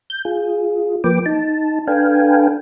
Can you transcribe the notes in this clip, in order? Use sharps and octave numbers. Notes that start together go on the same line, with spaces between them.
G6
F4 G#4
F3 A#3 B4 G5 D6
D#4 A5
D4 A4 B4 F5 G5 G#5